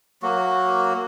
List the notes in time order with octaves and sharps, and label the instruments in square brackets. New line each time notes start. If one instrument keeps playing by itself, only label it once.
[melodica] F#3 A#3 F#4